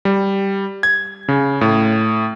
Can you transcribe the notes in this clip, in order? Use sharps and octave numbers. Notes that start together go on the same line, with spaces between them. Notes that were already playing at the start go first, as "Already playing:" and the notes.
G3
G#6
C#3
A2